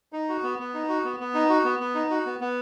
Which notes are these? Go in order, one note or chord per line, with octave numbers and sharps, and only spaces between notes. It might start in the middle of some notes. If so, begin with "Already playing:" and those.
D#4
F#4
B3
B3
D#4
F#4
B3
B3
D#4
F#4
B3
B3
D#4
F#4
B3
B3